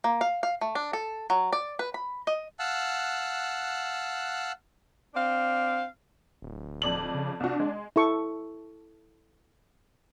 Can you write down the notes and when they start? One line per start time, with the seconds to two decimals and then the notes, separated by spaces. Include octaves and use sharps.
0.04 A#3
0.21 F5
0.43 F5
0.61 A3
0.75 D4
0.93 A4
1.30 F#3
1.53 D5
1.79 B4
1.94 B5
2.27 D#5
2.59 F5 F#5 A5 E6 F#6
5.14 C4 D4 F5
6.42 D1
6.82 F2 D5 F#7
7.15 C#3
7.40 C2 D4 F#4
7.60 G#3
7.96 E4 A4 C#6